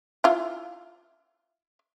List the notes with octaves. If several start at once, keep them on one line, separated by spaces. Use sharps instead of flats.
E4 F4